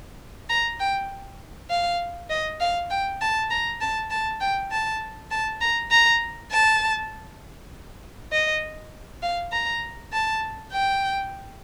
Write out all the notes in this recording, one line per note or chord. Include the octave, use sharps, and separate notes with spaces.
A#5
G5
F5
D#5
F5
G5
A5
A#5
A5
A5
G5
A5
A5
A#5
A#5
A5
D#5
F5
A#5
A5
G5